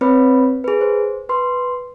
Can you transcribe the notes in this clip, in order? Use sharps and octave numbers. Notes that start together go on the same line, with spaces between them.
C4 B4 C#5 B5
G#4 B4
C5
B4 C6